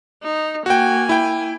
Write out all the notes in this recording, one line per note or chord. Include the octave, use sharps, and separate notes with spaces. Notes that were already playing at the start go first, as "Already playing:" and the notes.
D#4
A#3 F#4 G5 G#5
E4 G5